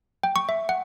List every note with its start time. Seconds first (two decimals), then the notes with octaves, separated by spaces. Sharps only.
0.23 G5
0.36 C#6
0.49 E5
0.69 F#5